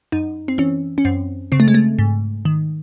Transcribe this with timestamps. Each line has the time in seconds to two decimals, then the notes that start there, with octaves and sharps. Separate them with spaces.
0.12 F#2 D#4
0.48 C4
0.58 E3 C#4
0.98 C#4
1.05 F#2 C4
1.52 C#3 C4
1.60 A3
1.68 G#3
1.74 A3
1.99 G#2
2.45 D#3